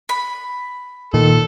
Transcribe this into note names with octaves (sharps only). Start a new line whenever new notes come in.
B5
A#2 D#3 A4